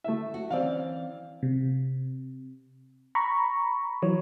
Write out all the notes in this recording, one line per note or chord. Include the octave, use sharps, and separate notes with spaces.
A3 E5
F#4
E3 C4 C#4 D5 F5
C3
A#5 B5 C#6
E3 F#3 C#5